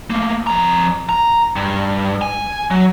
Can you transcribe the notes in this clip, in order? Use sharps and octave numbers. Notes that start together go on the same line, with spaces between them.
A3 A#3
F2 A#5
A#5
G2
G#5
F#3